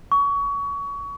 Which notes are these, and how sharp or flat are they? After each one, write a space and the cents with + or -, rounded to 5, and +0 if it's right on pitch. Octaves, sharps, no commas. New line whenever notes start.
C#6 +25